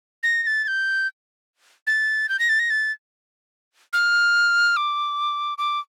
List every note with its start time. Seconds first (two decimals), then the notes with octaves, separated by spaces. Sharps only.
0.23 A#6
0.43 A#6
0.47 A6
0.64 A6
0.68 G6
1.87 A6
2.29 G6
2.39 A#6
2.49 A6
2.59 A#6
2.70 A6
3.93 F6
4.77 D6
5.58 D6